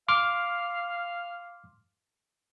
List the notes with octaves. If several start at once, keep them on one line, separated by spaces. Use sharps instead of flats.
F5 C6 D6 F6